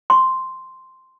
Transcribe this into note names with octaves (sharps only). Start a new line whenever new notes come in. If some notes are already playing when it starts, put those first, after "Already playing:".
C6